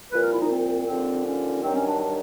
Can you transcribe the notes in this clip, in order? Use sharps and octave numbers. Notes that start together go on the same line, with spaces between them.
C2 A#2 F3 B4
A#4
E4
D#4
C4
D#2 D3 F3 C4
C#4
G2 D#3 F#3 C4
C#4
D4
D4